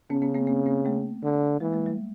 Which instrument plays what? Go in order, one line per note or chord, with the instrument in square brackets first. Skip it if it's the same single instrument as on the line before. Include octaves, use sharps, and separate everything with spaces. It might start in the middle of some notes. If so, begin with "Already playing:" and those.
[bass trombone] C#3 [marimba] B3 C#4
[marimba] B3 C#4
A#3 C4
A#3 C4
A#3 C4
A3 B3
[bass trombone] D3
[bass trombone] E3 [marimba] G#3 A#3
[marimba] G#3 A#3
G3 A3